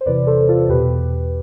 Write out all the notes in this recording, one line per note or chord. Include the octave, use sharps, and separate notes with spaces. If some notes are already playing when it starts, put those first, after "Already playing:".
C5
E2 C3 E3 B4 D5
A4 C5
F4 A4
E2 B2 G4 B4